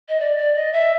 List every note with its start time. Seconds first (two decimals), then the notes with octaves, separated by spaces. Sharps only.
0.08 D#5
0.20 D5
0.37 D5
0.55 D#5
0.72 E5